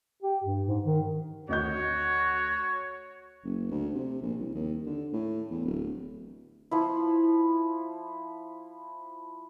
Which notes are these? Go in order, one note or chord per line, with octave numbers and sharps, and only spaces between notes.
G4
G2
G#2
D#3
D2 F#4 C#5 D#5 G6
F#1
D2
C3
A#1
C2
D#2
D3
A2
E2
D1
F3 E4